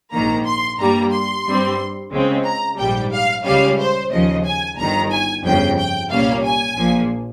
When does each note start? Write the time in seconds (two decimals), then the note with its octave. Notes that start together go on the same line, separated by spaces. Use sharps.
0.13 A#1 G#2 D#3 A#3 A#5
0.46 C6
0.79 G2 G3 A#3 A#5
1.12 C6
1.46 G2 G3 C4
2.13 C#2 C#3 G#3 C4
2.45 A#5
2.79 A#1 G#2 G3 G5
3.12 F5
3.45 C#2 C#3 G3 C#4 F5
3.78 C5
4.11 D#2 C#3 F3 D#5
4.45 G#5
4.78 G1 G2 D#3 A#5
5.11 G#5
5.44 G1 F2 C#3 G5
5.78 G5
6.10 C2 A#2 G3 A#3 C#4 F5
6.44 G#5
6.77 A#1 A#2 F3 A#3